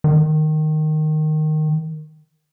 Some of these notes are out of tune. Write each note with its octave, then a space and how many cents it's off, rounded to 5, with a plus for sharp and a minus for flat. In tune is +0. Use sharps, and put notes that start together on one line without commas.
D#3 -10